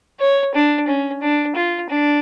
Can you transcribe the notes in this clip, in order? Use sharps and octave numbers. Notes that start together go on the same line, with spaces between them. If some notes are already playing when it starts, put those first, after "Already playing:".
C#5
D4
C#4
D4
F4
D4